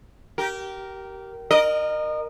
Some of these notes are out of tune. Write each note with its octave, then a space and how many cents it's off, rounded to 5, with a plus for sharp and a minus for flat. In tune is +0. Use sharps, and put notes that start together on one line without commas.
G4 -25 A#4 +0
A#4 +0 D#5 -30